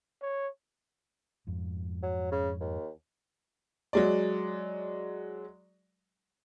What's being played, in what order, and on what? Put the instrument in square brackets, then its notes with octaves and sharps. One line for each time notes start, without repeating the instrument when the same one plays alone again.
[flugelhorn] C#5
[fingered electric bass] F2 G#2
[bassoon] F#3
C#3
D#2
[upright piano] F#3 G#3 D5